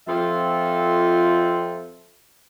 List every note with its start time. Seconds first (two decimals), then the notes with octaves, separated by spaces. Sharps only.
0.07 F2 C4 F4 A4 E5